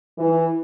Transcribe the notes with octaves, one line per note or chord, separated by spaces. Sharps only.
E3